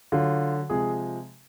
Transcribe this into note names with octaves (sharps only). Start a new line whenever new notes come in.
D3 F#3 F4
C3 F3 G#3 G#4